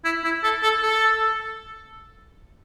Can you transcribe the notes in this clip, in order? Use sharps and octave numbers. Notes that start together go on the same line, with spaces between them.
E4
E4
A4
A4
A4